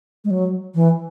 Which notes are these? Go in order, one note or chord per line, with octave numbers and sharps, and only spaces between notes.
G#3
F#3
E3